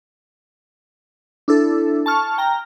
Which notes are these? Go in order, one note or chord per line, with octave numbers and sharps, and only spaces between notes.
D4 E4 A4
A5 C#6 F6
G5 A#5 F6